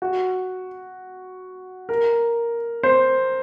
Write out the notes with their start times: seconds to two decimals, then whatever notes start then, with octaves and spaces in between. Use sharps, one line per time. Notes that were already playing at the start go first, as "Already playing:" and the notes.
0.02 F#4
1.89 A#4
2.83 C5